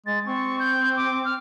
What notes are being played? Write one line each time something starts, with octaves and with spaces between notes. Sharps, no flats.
G#3 A6
C4 C#6
G6
D6
F6